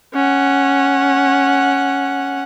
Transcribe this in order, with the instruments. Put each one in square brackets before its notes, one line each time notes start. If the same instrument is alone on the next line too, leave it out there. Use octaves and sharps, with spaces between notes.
[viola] C#4 F#5